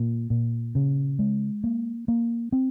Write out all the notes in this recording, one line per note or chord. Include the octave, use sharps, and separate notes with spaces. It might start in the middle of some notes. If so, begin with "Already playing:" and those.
Already playing: A#2
A#2
C#3
G#3
A#3
A#3
C4